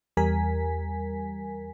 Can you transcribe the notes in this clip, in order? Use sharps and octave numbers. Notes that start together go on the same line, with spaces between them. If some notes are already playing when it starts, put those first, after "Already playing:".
E2 G3 A#4 G#5 B6